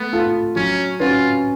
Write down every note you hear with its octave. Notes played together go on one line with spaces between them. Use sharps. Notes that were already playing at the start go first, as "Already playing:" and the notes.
Already playing: A3 B3
F4 A4
F#3 C#4
C#4 F4 F#4 B4